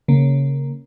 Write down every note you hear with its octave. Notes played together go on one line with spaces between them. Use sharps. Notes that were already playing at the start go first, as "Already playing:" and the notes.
C#3 A#3